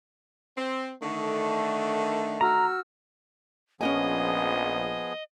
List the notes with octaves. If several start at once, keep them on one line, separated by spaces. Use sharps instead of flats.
C4
D3 D#3 A3 C#6
F#4 A#5 E6 F6
A#1 F3 B3 C#4 F#4 G#4 D#5 G#5